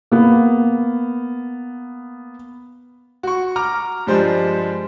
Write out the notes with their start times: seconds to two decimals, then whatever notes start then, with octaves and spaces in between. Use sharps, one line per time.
0.12 A#3 B3
3.23 F#4 C#6
3.56 A#5 D6 F6
4.07 G2 F3 G3 G#3 C5